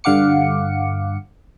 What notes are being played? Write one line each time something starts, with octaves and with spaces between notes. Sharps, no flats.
G2 D3 F5 F#5 D6 C#7